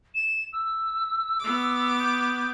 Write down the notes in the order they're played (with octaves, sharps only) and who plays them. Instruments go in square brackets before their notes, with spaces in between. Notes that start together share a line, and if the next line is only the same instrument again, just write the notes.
[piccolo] E7
E6
[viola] B3 D6
[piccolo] G6